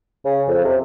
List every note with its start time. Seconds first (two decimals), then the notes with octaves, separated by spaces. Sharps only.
0.25 C#3
0.48 F2
0.64 C3